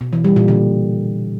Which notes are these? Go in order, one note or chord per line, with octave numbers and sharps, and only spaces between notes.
B2
E3
G3
A#2
D3